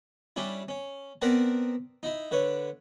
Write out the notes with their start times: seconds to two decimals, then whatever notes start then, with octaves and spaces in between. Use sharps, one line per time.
0.36 G3 C#4 D4 E4
0.68 C#4
1.22 B3 C4 A#4 B4 D5 A5
2.03 D#4 E4
2.31 D3 B4 C#5